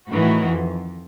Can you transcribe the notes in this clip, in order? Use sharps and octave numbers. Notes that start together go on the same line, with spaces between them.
A2 D#3 E3 F#4
F2